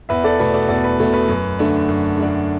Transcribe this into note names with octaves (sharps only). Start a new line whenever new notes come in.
E2 B4 E5
A4 D5
B2 A3 B4
A4 D5
E2 A4 D5
B4
B2 A3 A4
B4
F#2
D3 A3 D4
F#2
D3 A3 D4